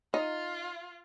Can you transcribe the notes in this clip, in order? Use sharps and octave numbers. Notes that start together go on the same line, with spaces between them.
D#4 F4